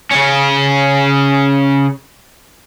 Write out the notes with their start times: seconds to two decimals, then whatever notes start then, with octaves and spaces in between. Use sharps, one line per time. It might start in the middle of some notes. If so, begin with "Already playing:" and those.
0.11 C#3 C#4